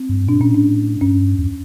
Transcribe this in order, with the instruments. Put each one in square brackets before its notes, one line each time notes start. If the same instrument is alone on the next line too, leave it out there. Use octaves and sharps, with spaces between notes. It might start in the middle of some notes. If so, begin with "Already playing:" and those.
Already playing: [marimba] C4
[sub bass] G2
[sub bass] A#2 [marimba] D4
[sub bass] A#2 [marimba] C#4
[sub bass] A2 [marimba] D4
[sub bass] G2 [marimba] C#4
[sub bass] E2